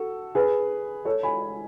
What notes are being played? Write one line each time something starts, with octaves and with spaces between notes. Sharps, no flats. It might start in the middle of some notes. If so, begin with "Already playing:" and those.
Already playing: F#4 A4
G#4 B4
A4 C#5
G#5 B5